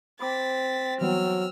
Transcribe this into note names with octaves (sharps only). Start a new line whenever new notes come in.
C4 B5 D6 A6 B6
E3 F#3 G3 B3 E6 F6